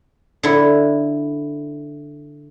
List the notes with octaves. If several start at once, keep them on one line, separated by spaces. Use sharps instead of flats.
D3 E4